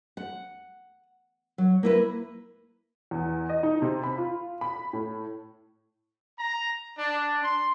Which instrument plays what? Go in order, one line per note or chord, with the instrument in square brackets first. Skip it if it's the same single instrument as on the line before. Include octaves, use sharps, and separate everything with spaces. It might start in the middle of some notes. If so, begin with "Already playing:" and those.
[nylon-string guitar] F#5
F#3
A#3 E4 B4
[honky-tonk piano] E2
D#5
D#4
C3
B5
F4
B5
A2
[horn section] A#5
D4
C6